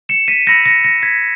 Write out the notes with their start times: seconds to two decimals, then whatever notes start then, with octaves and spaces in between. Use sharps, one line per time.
0.09 C#7 E7
0.28 B6 D#7
0.47 B5 E6 G6 A#6 C#7
0.66 A#6 C#7
0.84 A#6 C#7
1.03 G#6 B6